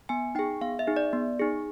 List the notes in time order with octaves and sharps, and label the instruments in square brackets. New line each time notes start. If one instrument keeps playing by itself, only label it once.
[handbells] B3 G#5
D#4 G#4 G5
B3 F5
E5
D#4 G#4
D5
B3
D#4 G#4